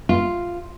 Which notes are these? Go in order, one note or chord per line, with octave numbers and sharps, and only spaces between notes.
F4